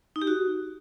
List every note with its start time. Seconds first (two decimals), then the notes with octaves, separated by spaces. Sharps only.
0.16 D#4
0.22 G4
0.27 F#4